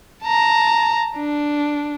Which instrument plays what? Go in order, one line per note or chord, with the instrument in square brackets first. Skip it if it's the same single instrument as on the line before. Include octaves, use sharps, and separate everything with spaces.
[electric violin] A5 A#5
D4